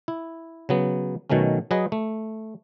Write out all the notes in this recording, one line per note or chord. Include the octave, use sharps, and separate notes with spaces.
E4
C#3 F#3 B3
B2 D#3 F#3 A3 C#4
F#3 G#4 B4 D#5
A3